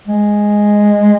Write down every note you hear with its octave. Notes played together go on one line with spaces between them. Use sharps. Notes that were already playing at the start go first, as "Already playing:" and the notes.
G#3